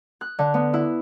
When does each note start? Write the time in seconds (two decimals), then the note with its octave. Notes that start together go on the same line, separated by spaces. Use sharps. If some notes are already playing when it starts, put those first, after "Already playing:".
0.21 F#6
0.39 D3
0.54 B3
0.74 E4